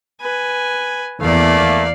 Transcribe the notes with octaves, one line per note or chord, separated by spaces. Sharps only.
B4 G#5
E2 A3 A#3 D5 F5